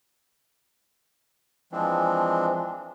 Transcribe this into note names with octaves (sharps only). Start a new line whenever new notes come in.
E3 F3 G#3 C4 D4